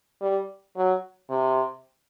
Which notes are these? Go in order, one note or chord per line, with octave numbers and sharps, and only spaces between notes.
G3
F#3
C3